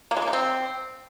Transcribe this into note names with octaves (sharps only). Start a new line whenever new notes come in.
A#3
G#3
A#3
D#4
C4